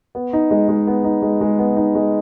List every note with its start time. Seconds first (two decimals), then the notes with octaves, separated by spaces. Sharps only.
0.15 B3
0.33 D#4
0.51 G#3
0.69 G#3
0.87 B3
1.04 D#4
1.22 G#3
1.41 G#3
1.59 B3
1.77 D#4
1.95 G#3